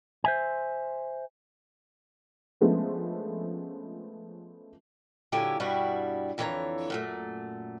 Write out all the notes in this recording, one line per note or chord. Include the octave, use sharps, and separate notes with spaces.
C5 E5 G#5
F3 G#3 A3 B3 C#4 D4
A#2 D3 F#3 E4 G4 G#5
G2 B2 G3 E4 F#4
F2 D3 E3 G#4 C#5 A#5
F#2 A#2 A3